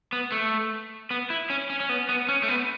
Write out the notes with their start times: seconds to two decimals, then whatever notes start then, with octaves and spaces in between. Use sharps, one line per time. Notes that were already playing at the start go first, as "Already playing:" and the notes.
0.13 B3
0.32 A3
1.11 B3
1.30 E4
1.50 C#4
1.70 C#4
1.80 C#4
1.89 B3
2.09 B3
2.28 C#4
2.43 A3
2.48 B3